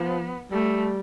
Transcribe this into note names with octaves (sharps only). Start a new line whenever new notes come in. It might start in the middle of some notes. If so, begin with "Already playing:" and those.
Already playing: F3 B3
G3 A3